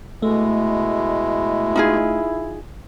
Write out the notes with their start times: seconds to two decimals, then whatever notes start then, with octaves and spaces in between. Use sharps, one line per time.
0.22 B2 G#3 A3 E4
1.76 D#4 F4 G#4